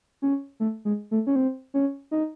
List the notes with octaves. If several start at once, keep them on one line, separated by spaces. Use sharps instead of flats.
C#4
A3
G#3
A3
C#4
C4
C#4
D#4